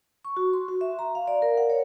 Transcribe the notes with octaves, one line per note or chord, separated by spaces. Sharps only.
C#6
F#4
C6
F#4
E5
A#5
F5
D5
A#4
F#5
C#5